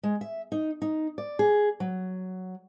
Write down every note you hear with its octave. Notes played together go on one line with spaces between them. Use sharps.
G#3
E5
D#4
D#4
D5
G#4
F#3